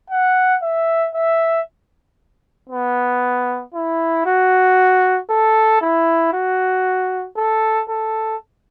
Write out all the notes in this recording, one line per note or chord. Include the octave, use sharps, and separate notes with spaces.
F#5
E5
E5
B3
E4
F#4
A4
E4
F#4
A4
A4